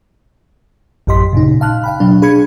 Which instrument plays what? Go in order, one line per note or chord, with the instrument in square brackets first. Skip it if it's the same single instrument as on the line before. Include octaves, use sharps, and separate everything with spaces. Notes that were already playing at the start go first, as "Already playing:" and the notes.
[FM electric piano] A1 F#2 G4 D#5 C6 B6
A#2 C#3 D#4
F5 A5 F6 F#6
F5 G5 B5
B2 F#3 D4
D4 G#4 B5 G#6 C#7